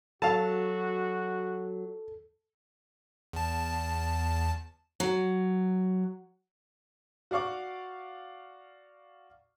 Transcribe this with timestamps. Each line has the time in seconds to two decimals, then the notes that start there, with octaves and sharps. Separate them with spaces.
0.22 F#3 F#4 A4 F5 A5
3.33 E2 A5
5.00 F#3
7.31 F#4 D5 F5 C#6 D6